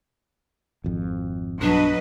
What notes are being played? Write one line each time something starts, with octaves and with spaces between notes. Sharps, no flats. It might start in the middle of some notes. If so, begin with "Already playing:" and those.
G#1 F2
B1 G2 F#3 D4 B4 D#5